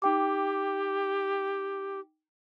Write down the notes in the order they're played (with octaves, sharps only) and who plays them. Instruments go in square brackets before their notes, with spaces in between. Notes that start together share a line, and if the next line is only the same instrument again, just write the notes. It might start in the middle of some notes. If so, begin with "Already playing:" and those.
[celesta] D#4 G5 D6 [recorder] G4